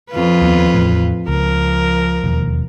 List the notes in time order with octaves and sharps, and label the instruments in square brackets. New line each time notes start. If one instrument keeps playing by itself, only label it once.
[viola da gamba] F2 F4 B4
[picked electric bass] D#2 A3 B3
E2 A2
[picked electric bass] C#2 [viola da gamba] F3 A#4
[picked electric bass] E1 D#2